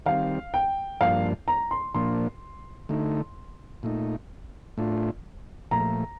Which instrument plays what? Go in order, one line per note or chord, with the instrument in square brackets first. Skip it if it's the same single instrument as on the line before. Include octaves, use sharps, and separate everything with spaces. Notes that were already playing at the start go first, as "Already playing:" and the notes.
[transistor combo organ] D#3 G3 C4 [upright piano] F5
[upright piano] G5
[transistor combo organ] G2 F3 A#3 D4 [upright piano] F5
[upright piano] A#5
C6
[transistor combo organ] A#2 F3 A#3 D4 [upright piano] C6
[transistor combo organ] D3 A3 D#4
A#2 A3 D#4
A2 A3 D4 F4
[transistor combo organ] A#2 F3 A3 [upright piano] A#5